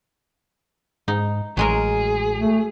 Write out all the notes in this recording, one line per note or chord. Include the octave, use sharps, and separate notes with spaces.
G#2 D#4
A1 F#3 G#3 G#4 A#4
A3